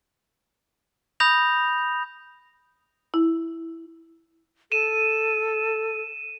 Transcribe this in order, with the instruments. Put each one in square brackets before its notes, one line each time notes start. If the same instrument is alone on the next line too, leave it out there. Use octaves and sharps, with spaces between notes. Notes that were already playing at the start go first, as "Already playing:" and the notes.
[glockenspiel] B5 D#6 G6 A#6 F7
[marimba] E4
[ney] A4 [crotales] D#7 E7